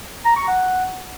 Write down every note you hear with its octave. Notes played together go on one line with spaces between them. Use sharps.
A#5
C#6
F#5